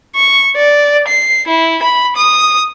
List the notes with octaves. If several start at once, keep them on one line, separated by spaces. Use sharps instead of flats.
C#6
D5
C7
E4
B5
D#6